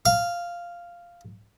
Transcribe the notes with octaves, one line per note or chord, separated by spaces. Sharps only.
F5